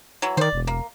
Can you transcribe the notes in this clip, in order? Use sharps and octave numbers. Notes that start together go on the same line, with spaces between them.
E3 F#3
D#3 C5 D5
E1
A#3